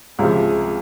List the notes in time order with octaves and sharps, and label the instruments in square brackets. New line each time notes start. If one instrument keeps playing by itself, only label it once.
[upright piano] C#2 C3 F3 [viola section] G#4